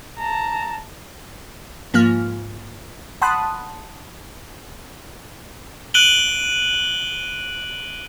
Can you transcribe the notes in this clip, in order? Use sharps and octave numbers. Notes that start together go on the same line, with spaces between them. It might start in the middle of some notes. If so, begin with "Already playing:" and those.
A5 A#5
G#2 F3 A#3 F4 F6
F#5 A5 B5 C6 D#6 F#6
F#6 D7 D#7 F#7 G7